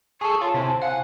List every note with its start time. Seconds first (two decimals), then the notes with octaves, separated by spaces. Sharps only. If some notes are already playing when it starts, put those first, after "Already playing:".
0.21 G#4 A4 A5 C#6
0.41 F4 C#5 A5 C6 C#6
0.54 C3 E4 C5 G#5
0.82 F5 F#5 G#5